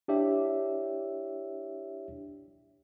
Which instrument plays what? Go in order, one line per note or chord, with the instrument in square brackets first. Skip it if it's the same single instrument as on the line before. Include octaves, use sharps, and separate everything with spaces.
[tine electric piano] D4 E4 G4 C#5 E5